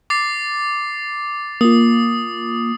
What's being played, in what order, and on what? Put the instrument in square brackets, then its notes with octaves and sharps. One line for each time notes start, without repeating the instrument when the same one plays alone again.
[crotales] D6 A6 C7
[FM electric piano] A#3 F4 [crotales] D#6